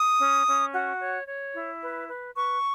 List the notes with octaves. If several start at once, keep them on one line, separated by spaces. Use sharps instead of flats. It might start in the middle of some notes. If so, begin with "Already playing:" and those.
Already playing: D#6
C#4
C#4
F#4
C#5
C#5
E4
B4
B4
B4 C#6